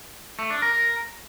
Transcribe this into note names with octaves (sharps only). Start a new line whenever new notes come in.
A3
D4
A#4